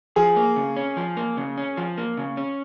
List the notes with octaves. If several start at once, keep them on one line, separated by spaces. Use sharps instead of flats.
F3 G#4
A#3
C#3
C#4
F3
A#3
C#3
C#4
F3
A#3
C#3
C#4